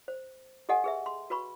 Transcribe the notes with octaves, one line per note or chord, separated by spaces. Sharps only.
C5
G4 A4 D#5 F#5 G#5
G#4 B4 E5
C6
F#4 B4 B5 C#6